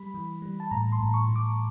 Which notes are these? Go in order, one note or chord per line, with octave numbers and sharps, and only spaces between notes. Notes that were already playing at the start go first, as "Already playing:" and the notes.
Already playing: G3 B5
E3
G3
A5
A2 A#5
C6
A2
C#6
A2
D6